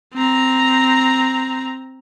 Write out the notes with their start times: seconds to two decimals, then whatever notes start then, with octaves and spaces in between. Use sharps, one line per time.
0.14 C4 A#5